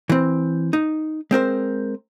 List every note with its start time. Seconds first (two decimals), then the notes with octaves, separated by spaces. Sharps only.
0.09 E3 C4
0.73 D#4
1.31 G#3 C4 A#4 C5